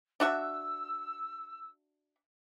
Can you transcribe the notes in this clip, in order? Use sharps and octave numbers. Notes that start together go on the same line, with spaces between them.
D4 F#4 E5 E6